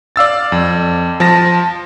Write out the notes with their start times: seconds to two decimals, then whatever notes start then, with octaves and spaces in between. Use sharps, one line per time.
0.16 D5 F5 E6 A6
0.52 F2
1.20 F3 A5 A#6